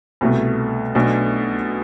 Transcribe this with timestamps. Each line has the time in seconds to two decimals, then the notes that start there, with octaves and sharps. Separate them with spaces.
0.21 C2 B2 A3
0.95 B1 B2 A3 D4